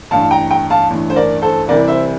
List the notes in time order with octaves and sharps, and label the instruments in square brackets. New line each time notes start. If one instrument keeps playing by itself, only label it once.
[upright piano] A1 G2 E3 F5 A5
G5 A#5
G5 A#5
F5 A5
A1 G2 E3
C5
A#4 D5
A4 C5
C2 C3 E3 G3 A#4 D5
C5 E5